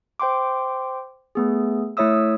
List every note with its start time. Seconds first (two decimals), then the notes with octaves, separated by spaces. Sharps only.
0.20 C5 G5 C6 D6
1.35 A3 B3 G#4
1.97 A3 E4 C#5 E5 D#6 E6